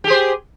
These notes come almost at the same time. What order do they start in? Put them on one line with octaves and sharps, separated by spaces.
G4 G#4 C5